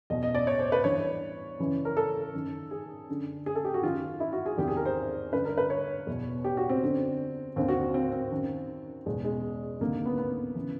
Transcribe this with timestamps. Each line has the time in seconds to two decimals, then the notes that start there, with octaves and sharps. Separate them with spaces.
0.10 E2 B2 D#5
0.23 D#5
0.35 D5
0.47 C#5
0.59 C5
0.72 B4
0.84 G2 E3 C#5
1.59 F#2 C#3 E3
1.85 A#4
1.97 A4
2.34 F#2 D#3
2.71 G#4
3.09 F#2 D3
3.46 G#4
3.55 A4
3.65 G4
3.74 F#4
3.83 F#2 D#3 F4
4.20 E4
4.33 F#4
4.46 G#4
4.57 E2 C3 D#3 G4
4.68 G#4
4.77 A#4
4.85 C5
5.32 G2 D3 B4
5.45 A#4
5.58 B4
5.70 C#5
6.07 E2 B2
6.44 G4
6.57 F#4
6.69 C4
6.82 F#2 D3
7.56 D#2 D3 C4
7.68 F#4
7.81 F#4
7.94 C4
8.12 C4
8.31 F#2 D#3
9.06 E2 B2 G#3
9.24 G#3
9.80 D2 C3 D#3 A#3
10.05 B3
10.18 B3
10.55 C#3 E3